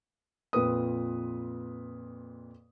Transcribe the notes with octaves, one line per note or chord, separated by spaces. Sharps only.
F2 A#2 B4 D#6